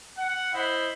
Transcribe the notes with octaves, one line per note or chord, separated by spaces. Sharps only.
F#5
E4 C5 D#5 B5